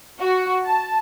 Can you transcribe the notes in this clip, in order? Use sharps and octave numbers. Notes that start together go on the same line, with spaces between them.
F#4
A5